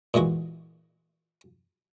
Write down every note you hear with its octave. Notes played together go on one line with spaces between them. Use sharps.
A#2 E3 G#3 F#4